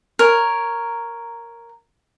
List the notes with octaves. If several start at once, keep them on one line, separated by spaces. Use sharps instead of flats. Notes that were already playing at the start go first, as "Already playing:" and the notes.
A#4 C#5